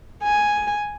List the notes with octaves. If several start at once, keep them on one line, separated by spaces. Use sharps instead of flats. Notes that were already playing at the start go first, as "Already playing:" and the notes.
G#5